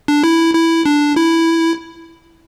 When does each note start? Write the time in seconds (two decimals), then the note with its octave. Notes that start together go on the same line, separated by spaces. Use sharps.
0.08 D4
0.23 E4
0.54 E4
0.86 D4
1.16 E4